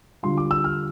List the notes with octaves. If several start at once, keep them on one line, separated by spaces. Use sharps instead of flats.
D3 G3 D4 F4 C6
D6
E6
F6